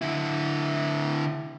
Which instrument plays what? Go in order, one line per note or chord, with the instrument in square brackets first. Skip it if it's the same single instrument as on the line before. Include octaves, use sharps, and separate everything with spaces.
[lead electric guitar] D3 E4